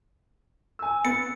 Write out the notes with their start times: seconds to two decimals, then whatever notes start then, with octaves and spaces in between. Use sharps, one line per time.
0.79 G#5 E6
1.05 B3 A6 C#7